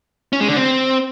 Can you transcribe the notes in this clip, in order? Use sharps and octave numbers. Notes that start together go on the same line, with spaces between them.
C#4
G#3
D3
C4